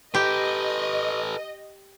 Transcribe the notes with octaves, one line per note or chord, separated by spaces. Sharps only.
G4 A4 B4 D#5